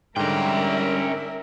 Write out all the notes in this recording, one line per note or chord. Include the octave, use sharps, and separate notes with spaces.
G#2 D3 G3 C#4 A#4 E5 G5